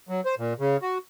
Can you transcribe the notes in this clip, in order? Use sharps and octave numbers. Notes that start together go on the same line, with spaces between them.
F#3
C5
A#2
C#3
F#4